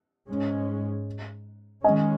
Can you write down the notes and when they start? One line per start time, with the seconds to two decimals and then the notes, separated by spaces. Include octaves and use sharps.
0.29 G#2 G#3 C#4
1.84 D#3 G#3 C#4 D#5 G#5